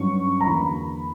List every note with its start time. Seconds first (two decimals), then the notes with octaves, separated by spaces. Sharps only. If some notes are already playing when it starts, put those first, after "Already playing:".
Already playing: G2 F#3 C#4 C#6
0.40 A#5
0.46 E2 D3 A#3 B5